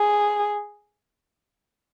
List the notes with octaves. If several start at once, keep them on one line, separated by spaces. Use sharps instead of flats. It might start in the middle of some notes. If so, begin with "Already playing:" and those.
Already playing: G#4